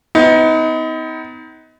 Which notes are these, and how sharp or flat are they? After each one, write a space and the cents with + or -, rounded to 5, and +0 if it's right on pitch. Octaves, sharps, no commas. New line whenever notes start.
B3 +35 D#4 +35